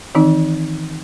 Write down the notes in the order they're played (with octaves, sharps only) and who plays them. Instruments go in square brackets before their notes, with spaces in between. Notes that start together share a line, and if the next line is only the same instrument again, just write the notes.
[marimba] D#3 E3 C4 D#4